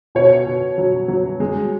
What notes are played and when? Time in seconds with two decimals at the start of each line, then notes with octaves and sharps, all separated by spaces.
0.15 B2 C#5
0.46 B2
0.78 F#3
1.08 F#3
1.40 G#3